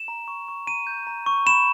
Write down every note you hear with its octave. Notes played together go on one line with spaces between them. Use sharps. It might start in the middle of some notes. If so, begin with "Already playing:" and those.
Already playing: E7
A#5
C#6
C#6
A#5 D#7
G6
A#5
C#6
B5 E7